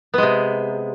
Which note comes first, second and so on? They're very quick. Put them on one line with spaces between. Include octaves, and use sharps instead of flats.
B3 G#3 C3